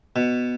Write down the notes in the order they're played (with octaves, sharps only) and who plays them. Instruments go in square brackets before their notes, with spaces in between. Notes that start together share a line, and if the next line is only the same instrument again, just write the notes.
[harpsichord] B2